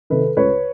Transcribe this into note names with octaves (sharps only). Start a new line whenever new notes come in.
C3 D#3 A4 B4
C#2 B4 C#5